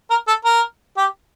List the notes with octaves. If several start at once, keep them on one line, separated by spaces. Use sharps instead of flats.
A#4
A4
A#4
G4